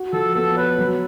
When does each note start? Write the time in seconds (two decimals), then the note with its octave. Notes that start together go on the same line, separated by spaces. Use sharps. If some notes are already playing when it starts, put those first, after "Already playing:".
Already playing: F#4
0.13 F3 A4
0.35 B3 A4
0.57 B4 C#5
0.79 F#3